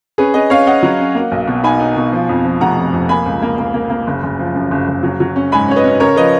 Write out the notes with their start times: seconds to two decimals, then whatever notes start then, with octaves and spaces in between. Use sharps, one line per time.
0.18 C#4 G#4 B4
0.34 C#4 B4 D#5
0.50 C#4 C#5 F5
0.67 C#4 D#5 F#5
0.83 F#3
0.99 C#4
1.15 A#3
1.32 B1
1.47 B2
1.63 D#4 G#5 B5
1.80 D#4
1.97 B2
2.12 F3
2.29 F2
2.45 F3
2.61 F1 F#5 A#5
2.77 F2
2.93 F2
3.09 A#3 G#5 B5
3.26 C#2
3.42 A#3
3.59 A#3
3.74 A#3
3.90 A#3
4.07 F#1
4.23 F#1
4.39 F3
4.55 F#2
4.71 F#1
4.88 F#1
5.03 F#3
5.20 F#3
5.36 C#4
5.52 G#2 G#5 B5
5.68 C#4 C#5
5.76 B4 D#5
5.84 C#4
6.00 C#3 A#4 C#5
6.16 F3 B4 D#5